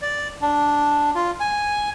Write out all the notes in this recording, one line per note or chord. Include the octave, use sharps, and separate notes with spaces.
D5
D4
F4
G#5